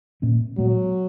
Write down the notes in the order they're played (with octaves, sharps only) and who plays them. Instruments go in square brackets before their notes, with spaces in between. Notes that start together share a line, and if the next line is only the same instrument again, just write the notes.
[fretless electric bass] A#2 A#3 C#4
[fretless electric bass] A#2 G#3 B3 [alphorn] F#3